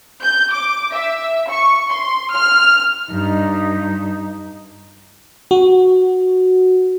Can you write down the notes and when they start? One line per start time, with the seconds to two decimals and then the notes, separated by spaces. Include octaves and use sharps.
0.23 G6
0.53 D6
0.93 E5
1.51 C#6
1.91 C6
2.32 F6
3.10 G2 D#4
5.51 F#4